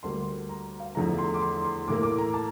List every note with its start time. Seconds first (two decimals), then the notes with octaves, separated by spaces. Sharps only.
0.03 D2 D3 G3 A#3 C6
0.49 A#5
0.80 F5
0.95 E2 D3 F3 A3 A#5
1.18 C6
1.34 D6
1.42 C6
1.65 C6
1.88 A2 E3 A#3 D6
2.03 D6
2.18 A#5
2.34 A5